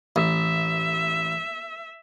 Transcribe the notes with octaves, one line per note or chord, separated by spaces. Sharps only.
A1 E5